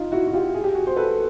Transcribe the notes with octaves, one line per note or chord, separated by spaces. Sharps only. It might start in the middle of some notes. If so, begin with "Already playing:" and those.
Already playing: D#4 F4
E4 F#4
F#4
F4 G4
G#4
G4
F#4 G#4
C5
A4 B4